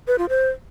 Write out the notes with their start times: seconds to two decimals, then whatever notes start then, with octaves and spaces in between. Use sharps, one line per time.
0.08 B4
0.18 F4
0.29 C5